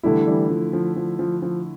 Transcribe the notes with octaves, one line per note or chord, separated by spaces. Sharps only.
D3 E3 G3 A3 E4
E3 G3
F3
F3
F3
F3
F3